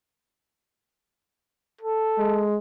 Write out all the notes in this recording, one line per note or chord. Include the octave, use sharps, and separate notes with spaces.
A4
G#3